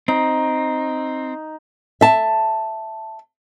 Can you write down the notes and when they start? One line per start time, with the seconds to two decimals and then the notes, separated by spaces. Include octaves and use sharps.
0.08 C4 D#4
2.01 E5 A5